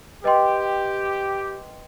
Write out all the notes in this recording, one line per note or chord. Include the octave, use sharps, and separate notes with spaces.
G4 B4 D#5 G5 C6